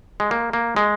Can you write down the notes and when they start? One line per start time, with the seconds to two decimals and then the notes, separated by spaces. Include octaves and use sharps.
0.20 G#3
0.31 A#3
0.53 A#3
0.76 G#3